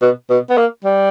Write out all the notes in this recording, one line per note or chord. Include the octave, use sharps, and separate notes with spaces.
B2
B2
B3
A#3
G3